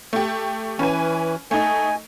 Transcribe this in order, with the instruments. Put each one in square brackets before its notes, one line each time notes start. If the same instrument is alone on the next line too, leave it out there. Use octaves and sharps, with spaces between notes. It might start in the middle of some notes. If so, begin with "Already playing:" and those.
[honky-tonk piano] A3 G4
[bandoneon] E3 [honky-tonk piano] C#4 B4 G#5
[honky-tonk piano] A3 D#4 [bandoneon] G#5